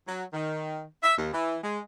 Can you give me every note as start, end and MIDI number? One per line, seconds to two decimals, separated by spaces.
0.08 0.24 54
0.33 0.85 51
1.03 1.17 76
1.18 1.33 39
1.33 1.58 52
1.63 1.80 56